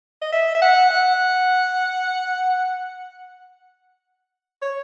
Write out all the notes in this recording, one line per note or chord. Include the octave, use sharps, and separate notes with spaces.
D#5
E5
E5
F#5
F#5
C#5